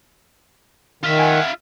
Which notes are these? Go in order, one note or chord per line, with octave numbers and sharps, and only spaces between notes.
D#3 F4 E5
F#5 G#5